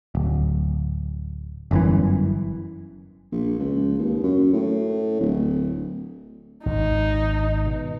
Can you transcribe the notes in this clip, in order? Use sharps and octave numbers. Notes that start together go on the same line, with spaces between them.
D1
G1 F#2 E3
A#1
C#2
D#2
F#2
A2
D1
G#1 D#4
B2